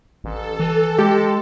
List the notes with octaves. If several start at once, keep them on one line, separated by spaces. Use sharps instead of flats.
A1 A4
E3
G#3 G4